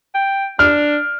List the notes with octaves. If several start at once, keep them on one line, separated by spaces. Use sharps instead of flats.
G5
D4 F6